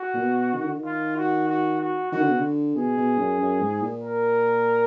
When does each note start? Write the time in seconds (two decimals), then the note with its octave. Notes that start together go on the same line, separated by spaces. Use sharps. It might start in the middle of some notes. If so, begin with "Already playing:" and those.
Already playing: F#4
0.14 A#2
0.22 B2
0.54 D#3
0.64 D3
0.75 D#3
0.85 F4
1.17 F#4
1.49 F#4
1.80 F#4
2.12 D#3 F#4
2.21 D3
2.29 B2
2.38 D3
2.76 B2 G#4
2.97 B2
3.18 F#2
3.39 F#2
3.61 G#2
3.82 A#2
4.03 A#4